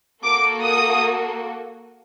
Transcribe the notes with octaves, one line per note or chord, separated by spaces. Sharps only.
A#3 F#4 A4 D6
D#6